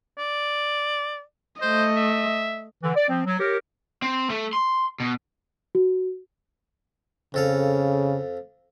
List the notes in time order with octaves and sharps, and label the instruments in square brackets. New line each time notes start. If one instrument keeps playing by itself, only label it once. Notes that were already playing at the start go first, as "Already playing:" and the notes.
[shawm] D5
[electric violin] A3 D#5 [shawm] C5
[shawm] E5
[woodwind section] D3 E3
D5
F3 C4
F#3
G4 A#4 C#5
[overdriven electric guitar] C4
A3
C6
B2
[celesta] F#4
[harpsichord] F2 A4 F5 [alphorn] C#3